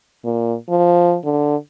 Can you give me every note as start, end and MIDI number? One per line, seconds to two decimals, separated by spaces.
0.25 0.54 46
0.69 1.17 53
1.25 1.56 50